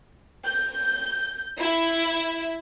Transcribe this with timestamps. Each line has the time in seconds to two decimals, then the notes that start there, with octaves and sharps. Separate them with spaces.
0.46 G6
1.58 E4